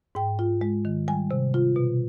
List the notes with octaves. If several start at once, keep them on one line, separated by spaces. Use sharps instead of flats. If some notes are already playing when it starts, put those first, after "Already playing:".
G#2 G5
F4
G#3
D#3
G3 G#5
C3
F4
B2